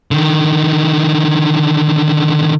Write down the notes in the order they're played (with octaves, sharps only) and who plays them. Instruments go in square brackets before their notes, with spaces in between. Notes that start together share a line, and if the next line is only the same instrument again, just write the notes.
[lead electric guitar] D3 D#3